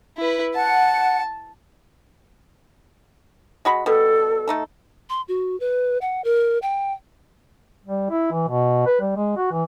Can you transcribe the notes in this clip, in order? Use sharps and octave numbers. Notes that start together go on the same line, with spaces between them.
E4 B4
F#5 A5
G#3 F#4 B5
B2 G3 A4
A3 D#4 A4
C6
F#4
B4
F#5
A#4
G5
G3
E4
E3
B2
B4
G3
G#3
F#4
E3